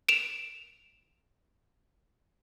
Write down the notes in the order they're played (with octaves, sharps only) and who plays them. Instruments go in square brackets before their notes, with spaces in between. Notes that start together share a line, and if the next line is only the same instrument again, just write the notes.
[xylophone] D7 E7 F7